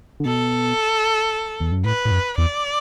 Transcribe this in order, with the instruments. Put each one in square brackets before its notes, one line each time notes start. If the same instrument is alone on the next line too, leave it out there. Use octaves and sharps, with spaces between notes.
[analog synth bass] D3
[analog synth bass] B2 [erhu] A4
[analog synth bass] E2
F#2
[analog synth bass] A2 [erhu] B4
[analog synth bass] A2
F#2
[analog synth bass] E2 [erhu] D5